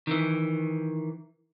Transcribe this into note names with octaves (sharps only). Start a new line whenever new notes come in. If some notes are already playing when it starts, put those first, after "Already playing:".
D#3 E3